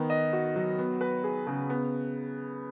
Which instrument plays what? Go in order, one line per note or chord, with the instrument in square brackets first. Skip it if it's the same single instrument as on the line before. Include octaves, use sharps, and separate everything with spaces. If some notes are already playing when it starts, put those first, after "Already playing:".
Already playing: [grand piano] D#3 B3
D#5
F#4
F#3
B3
B4
G#4
C#3
B3